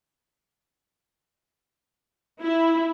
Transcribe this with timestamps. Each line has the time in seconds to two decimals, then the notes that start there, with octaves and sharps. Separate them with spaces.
2.42 E4